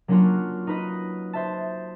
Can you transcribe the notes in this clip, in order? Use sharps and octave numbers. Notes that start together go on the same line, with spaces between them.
F#3 A#3 C#4 D4 F4 F#4
D#4 B4 D#5
C5 E5 A5